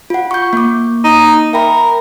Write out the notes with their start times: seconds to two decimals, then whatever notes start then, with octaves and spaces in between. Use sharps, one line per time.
0.10 F4 F#5
0.31 C#6 G6
0.53 A#3 D6
1.04 D#4
1.53 A#4 E5 G5 B5